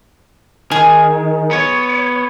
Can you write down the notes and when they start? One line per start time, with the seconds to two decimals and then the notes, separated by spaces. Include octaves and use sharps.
0.71 D#3 G#4
1.51 B3 C#5